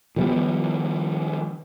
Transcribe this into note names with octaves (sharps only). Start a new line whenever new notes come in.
D#3 F3 G3 B3